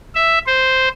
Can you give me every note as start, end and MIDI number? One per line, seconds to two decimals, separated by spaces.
0.15 0.38 76
0.46 0.88 72